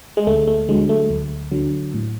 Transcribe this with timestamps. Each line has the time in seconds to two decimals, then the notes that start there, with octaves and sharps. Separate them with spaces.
0.17 G#3
0.27 D2 A3
0.47 A3
0.69 D3 F#3 G#3
0.89 A3
1.10 D2
1.52 D3 F#3
1.94 A2